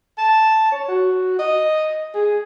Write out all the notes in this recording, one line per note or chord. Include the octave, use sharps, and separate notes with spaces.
A5
C#5
F#4
D#5
G#4